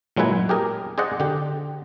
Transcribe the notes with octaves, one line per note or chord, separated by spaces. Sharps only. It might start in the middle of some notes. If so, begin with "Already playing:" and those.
A#2 F#3 G#3 E4 B4 G#5
G4 G#4 A#4
G#4 C5 D5 D#5 F#5
D3 G4